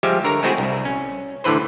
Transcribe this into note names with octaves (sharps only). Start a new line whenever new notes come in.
F3 G3 G#3 G4 E5
D3 A#4 C#5 A#5
G#3 A3 C4 E4 F#4 G#4
C2
C#4
A2 D3 E3 B4 C5